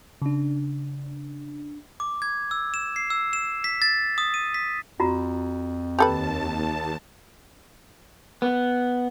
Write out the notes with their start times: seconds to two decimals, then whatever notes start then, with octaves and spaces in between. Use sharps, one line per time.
0.22 C#3 D4
2.00 D6
2.22 G#6
2.51 E6
2.74 E7
2.96 C7
3.10 E6
3.33 E7
3.64 B6
3.82 A6
4.18 D#6
4.34 D#7
4.54 B6
5.00 F2 F4 F#4 A#5
5.99 D#2 G4 A4 B4 A5
8.42 B3